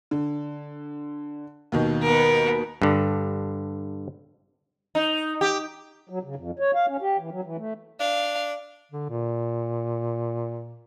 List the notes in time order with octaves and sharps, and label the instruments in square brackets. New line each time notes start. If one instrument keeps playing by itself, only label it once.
[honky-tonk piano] D3
D#2 B2 D#3
[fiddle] B3 A#4
[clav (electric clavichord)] G2 D3
[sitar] D#4
G4
[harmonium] F#3
C#3
F2
C#5
F5
C#4
G4
E3
F#3
E3
A3
[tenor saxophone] D4 [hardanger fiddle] F5
[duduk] D3
A#2